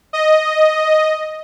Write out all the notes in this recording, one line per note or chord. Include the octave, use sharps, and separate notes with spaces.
D#5